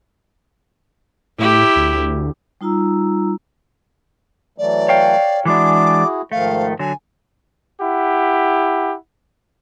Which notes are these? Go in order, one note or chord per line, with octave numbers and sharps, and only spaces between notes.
A2 E4 G4
D2
G3 D#4 F4 A#5 E6
E3 F#3 A3 D5
C#5 F5 G5
E3 G#3 D4 E4 F#4 G#4 D6
G#2 D#3 F3 A3 F5
D3 F#3 G#5
E4 G4 F#5